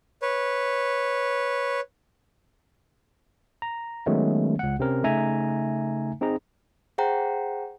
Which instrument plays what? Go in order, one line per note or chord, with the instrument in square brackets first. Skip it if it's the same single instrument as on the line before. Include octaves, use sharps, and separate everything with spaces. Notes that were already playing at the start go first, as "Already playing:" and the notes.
[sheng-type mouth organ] B4 C#5
[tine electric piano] A#5
D#3 F#3 G#3 A3 B3 C#4
C#2 F#5
C3 C4 C#4 A#4
C#3 A3 D#4 E5 G#5 A#5
C4 D#4 G#4 A#5
[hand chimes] G#4 C5 F#5 G5 A#5